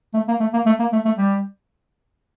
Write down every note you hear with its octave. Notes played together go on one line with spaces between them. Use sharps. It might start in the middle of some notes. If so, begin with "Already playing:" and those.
A3
A#3
A3
A#3
A3
A#3
A3
A3
G3